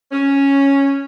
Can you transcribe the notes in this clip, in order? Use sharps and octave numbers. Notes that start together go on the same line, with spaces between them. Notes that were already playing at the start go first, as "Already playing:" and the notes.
C#4